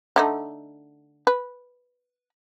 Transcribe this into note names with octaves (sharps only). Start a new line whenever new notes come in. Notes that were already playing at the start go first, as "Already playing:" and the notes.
D3 A3 D#4
B4